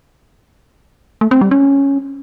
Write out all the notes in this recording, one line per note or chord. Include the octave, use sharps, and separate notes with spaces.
A3
C4
G3
C#4